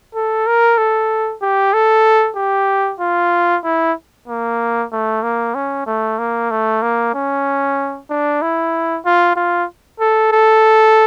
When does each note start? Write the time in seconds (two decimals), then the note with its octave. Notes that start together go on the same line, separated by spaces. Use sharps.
0.15 A4
0.47 A#4
0.78 A4
1.42 G4
1.73 A4
2.37 G4
3.00 F4
3.64 E4
4.28 A#3
4.92 A3
5.23 A#3
5.55 C#4
5.86 A3
6.18 A#3
6.51 A3
6.82 A#3
7.14 C#4
8.10 D4
8.42 E4
9.05 F4
9.36 F4
10.00 A4
10.32 A4